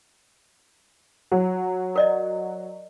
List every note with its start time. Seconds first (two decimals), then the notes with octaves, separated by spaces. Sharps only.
1.32 F#3
1.96 A#4 D5 D#5